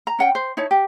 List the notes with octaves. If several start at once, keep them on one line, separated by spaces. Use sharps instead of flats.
A#5
C#4 F#5 G5
C5
D#4 E4 C#5 A5
G4